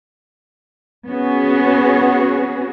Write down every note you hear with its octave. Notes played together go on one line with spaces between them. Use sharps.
B3 C#4 F#4 G#4